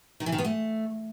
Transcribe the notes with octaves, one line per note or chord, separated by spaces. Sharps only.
D#3
E3
D#3
B3
A3